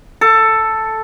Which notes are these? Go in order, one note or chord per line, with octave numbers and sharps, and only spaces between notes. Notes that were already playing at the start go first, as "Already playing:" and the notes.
A4